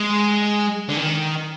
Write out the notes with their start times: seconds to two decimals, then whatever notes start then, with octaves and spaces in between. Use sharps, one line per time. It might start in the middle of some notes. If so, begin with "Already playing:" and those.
Already playing: G#3
0.89 D3
0.97 D#3